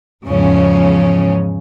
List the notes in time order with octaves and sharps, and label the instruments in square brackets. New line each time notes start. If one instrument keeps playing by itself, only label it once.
[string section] E2 G#2 C#3 F3 C#4